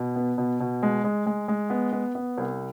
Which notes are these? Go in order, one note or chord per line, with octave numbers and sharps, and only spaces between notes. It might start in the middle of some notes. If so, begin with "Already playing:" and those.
Already playing: B2
B3
B2
B2
G#3
G#3
G#3
G#3
B3
B3
B3
C2